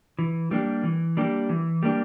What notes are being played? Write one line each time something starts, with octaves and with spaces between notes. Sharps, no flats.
E3
G3 A#3 D4 G4
E3
G3 A#3 D4 G4
E3
G3 A#3 D4 G4